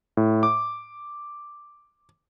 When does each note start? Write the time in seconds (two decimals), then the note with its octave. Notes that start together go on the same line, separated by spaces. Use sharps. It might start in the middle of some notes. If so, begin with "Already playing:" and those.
0.17 A2
0.43 D6